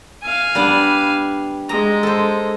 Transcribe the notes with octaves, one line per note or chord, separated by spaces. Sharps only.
F5 G#5
G3 B3 D4
G#3 A#5
A4 C5